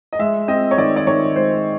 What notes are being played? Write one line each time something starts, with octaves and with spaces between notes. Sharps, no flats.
D#5
G#3 E5
C4 D#5
C#5
D#3 D5
D5
D#3 C#5
G#3 C5